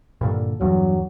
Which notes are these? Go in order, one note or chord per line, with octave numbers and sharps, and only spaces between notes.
G2 A#2 D3
E2 G2 F#3